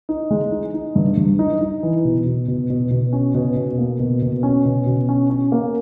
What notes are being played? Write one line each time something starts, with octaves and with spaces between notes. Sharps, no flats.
D#4
G#3
D#4
D#4
G2
G2
D#4
D#4
E3
B2
B2
B2
B2
B2
C#4
B2
B2
A#3
B2
B2
C#4
B2
B2
C#4
C#4
A#3